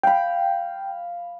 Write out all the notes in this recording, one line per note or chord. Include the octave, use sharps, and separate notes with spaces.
F5 G5 B5